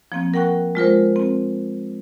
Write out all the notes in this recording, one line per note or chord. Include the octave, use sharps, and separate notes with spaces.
F3 A#3 C4
A#4 F#5 G5 C#6 F#6
G#3 F4 A#4 C5
C4